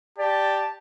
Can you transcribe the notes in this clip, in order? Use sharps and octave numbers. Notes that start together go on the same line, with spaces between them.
G4 D5 A5